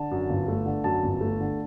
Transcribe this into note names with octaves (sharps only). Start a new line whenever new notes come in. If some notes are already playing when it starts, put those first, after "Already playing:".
Already playing: D3 A5
F#2
G1
A3
D3
F#2 A5
G1
A3
D3